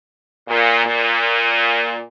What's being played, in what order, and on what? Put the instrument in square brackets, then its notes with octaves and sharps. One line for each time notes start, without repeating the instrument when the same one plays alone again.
[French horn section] A#2
A#2